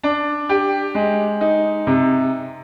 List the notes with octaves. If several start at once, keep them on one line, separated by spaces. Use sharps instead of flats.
D4
G4
G#3
D#4
C3